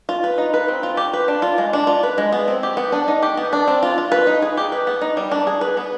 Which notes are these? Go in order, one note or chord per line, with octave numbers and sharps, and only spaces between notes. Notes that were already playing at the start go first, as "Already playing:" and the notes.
F4
B4
D#4
B4
C4
F4
G4
B4
D4
F4
G#3
D4
F4
B4
G#3
B3
C4
G4
B3
D4
D#4
G4
B3
D4
C4
F4
F4
B4
D#4
G#4
G4
B4
B3
D#4
G3
D4
G#4
B4
B3